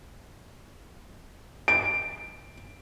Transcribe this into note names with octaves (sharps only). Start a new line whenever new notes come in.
D7